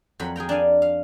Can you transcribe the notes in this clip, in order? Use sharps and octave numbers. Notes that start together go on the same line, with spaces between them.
F2 F#3 B5
G#4 A#4 G5 A#5
D4 D5 F5 G#5
F5